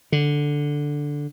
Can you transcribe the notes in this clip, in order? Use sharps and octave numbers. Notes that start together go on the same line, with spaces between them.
D3